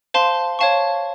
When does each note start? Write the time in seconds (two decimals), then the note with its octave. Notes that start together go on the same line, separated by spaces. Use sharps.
0.14 C5 F5 A5 C6
0.59 C#5 F5 A5 C#6